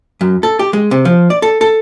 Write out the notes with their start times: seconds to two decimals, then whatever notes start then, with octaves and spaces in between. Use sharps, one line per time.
0.21 F#2
0.43 A4
0.59 G4
0.73 G#3
0.91 C3
1.05 F3
1.30 D5
1.42 A4
1.61 A4